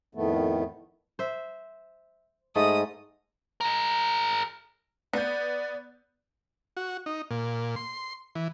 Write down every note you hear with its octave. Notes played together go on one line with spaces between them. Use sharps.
F2 A2 D#3 A3 B3
C5 E5
G#2 A3 D#5 D#6
G#4 A#4
B3 D5 G6
F#4
D#4
A#2
C6
E3